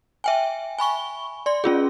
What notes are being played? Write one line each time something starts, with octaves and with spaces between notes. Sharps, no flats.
E5 G5 G#5
G#5 B5 C#6 G7
D5 C6
C#4 F4 G#4